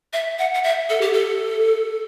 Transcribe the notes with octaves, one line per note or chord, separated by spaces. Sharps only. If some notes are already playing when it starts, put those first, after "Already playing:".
E5
F#5
F#5
E5
A4
G4
A4